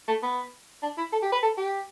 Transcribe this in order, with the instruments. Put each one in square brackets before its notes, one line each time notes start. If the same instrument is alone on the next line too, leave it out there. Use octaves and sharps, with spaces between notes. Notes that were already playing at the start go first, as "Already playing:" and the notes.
[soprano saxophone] A3
B3
D4
E4
A4
G4
B4
A4
G4